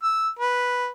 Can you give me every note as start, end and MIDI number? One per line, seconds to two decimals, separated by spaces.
0.03 0.30 88
0.39 0.89 71